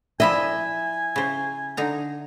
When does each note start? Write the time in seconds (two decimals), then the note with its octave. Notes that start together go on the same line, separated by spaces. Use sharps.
0.20 F3 E4 D#5 E5 G#5
1.16 C#3 C5
1.77 D3 D#4 A#5